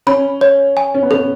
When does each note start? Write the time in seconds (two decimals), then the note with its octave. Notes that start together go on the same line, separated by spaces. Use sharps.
0.07 C#4 B5
0.41 C#5
0.77 G#5
0.94 C#4
1.03 B3
1.11 C#4 A4